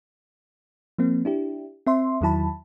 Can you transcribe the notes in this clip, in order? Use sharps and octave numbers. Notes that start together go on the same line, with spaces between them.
F3 A#3 C4
D4 E4 G4
C4 E5 C6
E2 D#3 F#3 E4 A5 B5